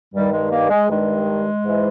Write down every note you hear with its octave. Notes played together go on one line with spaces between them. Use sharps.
G2 D#3 G3
G#3
A#3
G#3
G2 D#3 G#3
G#2 E3